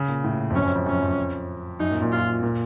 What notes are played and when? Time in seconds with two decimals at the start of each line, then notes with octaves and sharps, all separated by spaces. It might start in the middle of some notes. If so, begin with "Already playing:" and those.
Already playing: C#3
0.08 A#2
0.24 A2
0.50 F2
0.54 F#2 C#4
0.65 F2
0.76 F2
0.86 F#2 C#4
1.02 F2
1.80 F#2 D#4
1.91 A#2
2.02 A#2
2.12 F4
2.43 A#2